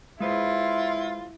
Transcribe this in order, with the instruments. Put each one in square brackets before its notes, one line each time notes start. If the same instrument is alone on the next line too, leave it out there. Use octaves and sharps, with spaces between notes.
[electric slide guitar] G#3 B4 C5 [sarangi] E4 [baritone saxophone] F4